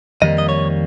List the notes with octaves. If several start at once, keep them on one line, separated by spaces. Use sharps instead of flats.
F2 D#3 G3 A#3 D#5
D#5
C#5